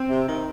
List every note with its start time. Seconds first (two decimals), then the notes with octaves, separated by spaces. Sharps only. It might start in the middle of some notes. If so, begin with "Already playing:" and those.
Already playing: C4
0.09 C3
0.27 D#3